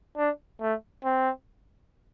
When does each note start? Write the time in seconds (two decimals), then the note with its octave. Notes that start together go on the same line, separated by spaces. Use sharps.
0.17 D4
0.61 A3
1.04 C4